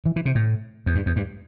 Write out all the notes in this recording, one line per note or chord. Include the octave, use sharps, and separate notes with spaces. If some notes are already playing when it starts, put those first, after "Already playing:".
E3
E3
C3
A2
E2
G2
E2
G2